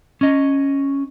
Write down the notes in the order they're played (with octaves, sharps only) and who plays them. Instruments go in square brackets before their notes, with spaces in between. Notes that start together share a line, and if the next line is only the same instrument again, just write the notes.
[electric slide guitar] C#4 D#5